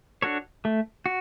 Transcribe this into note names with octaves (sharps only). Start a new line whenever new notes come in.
D4 F#4 A4 C#5
A3
F#4